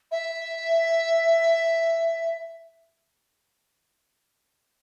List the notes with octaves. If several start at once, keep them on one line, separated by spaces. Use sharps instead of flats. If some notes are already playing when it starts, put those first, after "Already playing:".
E5